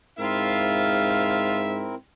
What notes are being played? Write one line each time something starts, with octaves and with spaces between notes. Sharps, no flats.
G#2 C4 E4 F4 A#4 E5 F5